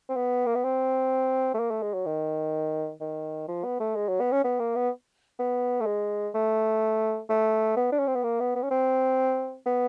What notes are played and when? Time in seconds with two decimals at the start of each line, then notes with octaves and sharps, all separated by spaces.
0.09 C4
0.16 B3
0.46 A#3
0.55 B3
0.64 C4
1.54 A3
1.59 A#3
1.71 A3
1.82 G#3
1.94 F#3
2.06 D#3
3.01 D#3
3.48 F3
3.64 B3
3.80 A3
3.96 G#3
4.09 F#3
4.20 B3
4.32 C#4
4.44 B3
4.60 A#3
4.75 B3
5.39 B3
5.81 A3
5.86 G#3
6.34 A3
7.29 A3
7.77 B3
7.92 D4
7.99 C#4
8.07 C4
8.15 B3
8.24 A#3
8.40 B3
8.56 B3
8.63 C#4
8.71 C4
9.66 B3